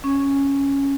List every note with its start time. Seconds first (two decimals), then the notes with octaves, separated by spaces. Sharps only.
0.04 C#4